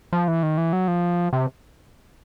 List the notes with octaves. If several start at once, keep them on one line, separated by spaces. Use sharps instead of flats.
F3
E3
D#3
E3
F#3
F3
C3